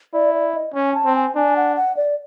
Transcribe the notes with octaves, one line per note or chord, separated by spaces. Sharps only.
E4 D5
D5
D#5
C#4 G#5
A5
C4
G#5
D4 G#5
F#5
F#5
D5